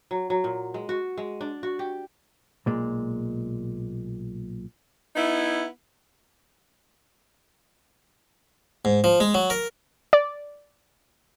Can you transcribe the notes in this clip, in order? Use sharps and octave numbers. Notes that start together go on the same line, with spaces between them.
F#3
F#3
A#2
G#3
F#4
G#3
D4
F#4
G4
B1 A#2 G#3
B3 D#4 E4
G#2
F3
G#3
F#3
A#4
D5